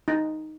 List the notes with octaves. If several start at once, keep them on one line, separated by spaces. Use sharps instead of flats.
D#4